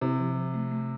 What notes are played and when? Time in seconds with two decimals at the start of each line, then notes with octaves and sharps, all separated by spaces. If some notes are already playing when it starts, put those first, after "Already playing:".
0.01 C3 E4
0.19 F3
0.36 F3
0.54 A3
0.71 A3